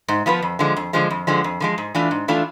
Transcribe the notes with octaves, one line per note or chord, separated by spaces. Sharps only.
G#2
F3 B3 F4 B4
F2
D3 F3 G#3
F2
D3 F3 G#3
F2
D3 F3 G#3
F2
D3 F3 G#3
G#2
E3 A3 D4 F4
G#2
E3 A3 D4 F4